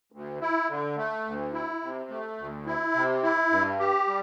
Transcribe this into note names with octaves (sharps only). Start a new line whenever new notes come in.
D2
E4
D3
A3
D2
E4
C3
A3
D2
E4
C3
E4
G2
G4
G3